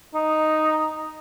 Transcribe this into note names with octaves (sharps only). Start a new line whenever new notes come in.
D#4